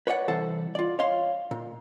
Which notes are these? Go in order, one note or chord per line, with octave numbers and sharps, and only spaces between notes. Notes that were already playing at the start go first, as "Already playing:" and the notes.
B4 C#5 D5 E5 F#5
C2 E3 A4 C5 F#5 A5
F4 D5
C#5 D#5 F5 C6
A#2